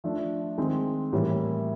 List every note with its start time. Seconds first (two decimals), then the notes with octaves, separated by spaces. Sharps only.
0.04 F3 A3 D4
0.58 D#3 G#3 C4
1.13 A2 E3 G3 A#3